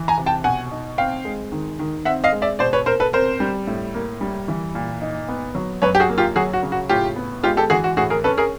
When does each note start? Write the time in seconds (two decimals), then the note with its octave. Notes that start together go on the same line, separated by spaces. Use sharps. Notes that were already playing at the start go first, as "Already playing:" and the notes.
Already playing: E3
0.08 G#5 A#5
0.18 C3
0.26 G5 A5
0.44 B2 F#5 G#5
0.71 D#4
0.98 C4 F5 G5
1.25 G#3
1.52 D#3
1.79 D#3
2.05 C4 E5 F#5
2.24 D#5 F5
2.32 G#3
2.42 D5 E5
2.59 B2 C5 D5
2.73 B4 C#5
2.86 B2 A#4 C5
3.00 A4 B4
3.13 C4 A#4 C5
3.40 G3
3.67 A2
3.94 A#3
4.21 G3
4.48 E3
4.75 A#2
5.02 D#4
5.28 B3
5.55 F#3
5.82 F#2 B4 C#5
5.95 G4
6.00 F#4 G#4
6.10 A#3
6.18 F4 G4
6.36 F#3 F#4 G#4
6.53 F#4
6.63 C#3
6.72 F#4
6.89 A2 F4 G4
7.16 B3
7.43 G#3 F4 G4
7.57 G4 A4
7.70 E3 F#4 G#4
7.84 F#4
7.97 A2 F#4 G#4
8.10 G#4 A#4
8.24 C#4 A4 B4
8.37 G#4 A#4